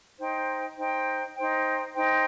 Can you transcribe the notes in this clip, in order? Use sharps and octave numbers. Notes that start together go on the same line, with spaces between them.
D#4 C5 G5
D#4 C5 G5
D#4 C5 G5
D#4 C5 G5